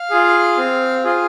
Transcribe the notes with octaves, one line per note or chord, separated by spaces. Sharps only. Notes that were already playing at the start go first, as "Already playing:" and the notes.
Already playing: F5
F4 G#4
C4
F4 G#4